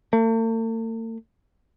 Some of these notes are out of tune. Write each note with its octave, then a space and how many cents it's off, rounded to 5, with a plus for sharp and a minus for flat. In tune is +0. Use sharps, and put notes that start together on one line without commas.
A3 +45